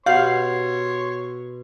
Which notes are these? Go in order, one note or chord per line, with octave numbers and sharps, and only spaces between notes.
B2 G4 C#5 F5 F#5 C6 C#6